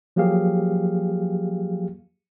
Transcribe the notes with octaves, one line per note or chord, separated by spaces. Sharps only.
F3 F#3 A#3 G4 G#4 F5